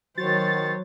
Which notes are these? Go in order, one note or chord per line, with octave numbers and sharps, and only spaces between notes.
D#3 F#3 C5 C#5 A6